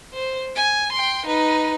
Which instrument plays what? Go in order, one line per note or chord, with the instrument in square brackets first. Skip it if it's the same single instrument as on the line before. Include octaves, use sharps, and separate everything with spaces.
[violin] C5
G#5
G5 C6
D#4 B4